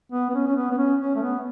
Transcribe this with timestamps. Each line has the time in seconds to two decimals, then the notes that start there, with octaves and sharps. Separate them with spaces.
0.12 B3
0.30 B3
0.35 C#4
0.48 C#4
0.56 B3
0.71 B3
0.78 C#4
1.00 C#4
1.15 A3
1.22 B3